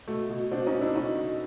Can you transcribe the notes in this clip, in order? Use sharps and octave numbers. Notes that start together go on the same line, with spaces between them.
B2 A3
B2
B2 C4 D4
C#4 D#4
B2
D4 E4
B2 C#4 D#4
B2